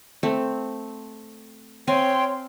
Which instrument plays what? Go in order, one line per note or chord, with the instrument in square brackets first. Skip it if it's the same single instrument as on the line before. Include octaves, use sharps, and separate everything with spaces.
[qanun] A3 C4
[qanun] C4 F5 G#5 [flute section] C#5 G5 C6